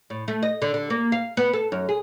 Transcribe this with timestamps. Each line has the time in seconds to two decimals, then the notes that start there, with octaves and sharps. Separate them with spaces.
0.10 A2
0.28 A3
0.42 D#5
0.62 D3
0.74 D3
0.90 A#3
1.12 F5
1.37 B3
1.53 A4
1.72 F#2
1.89 G#4